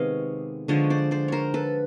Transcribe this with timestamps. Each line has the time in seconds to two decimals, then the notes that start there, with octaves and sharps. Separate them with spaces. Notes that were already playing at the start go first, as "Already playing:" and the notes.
Already playing: C3 D#3 G#3 B3 C#5 D#5 F5
0.68 D3 F3 G#3 C#5 D#5
0.90 C5 D5
1.11 C5 D5
1.28 A#4 C5 C#5
1.54 A4 B4